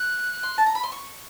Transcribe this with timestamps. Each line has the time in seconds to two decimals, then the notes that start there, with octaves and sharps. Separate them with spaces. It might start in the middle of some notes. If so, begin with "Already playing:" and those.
Already playing: F#6
0.43 C6
0.58 A5
0.66 A#5
0.75 B5
0.83 C6
0.92 C#6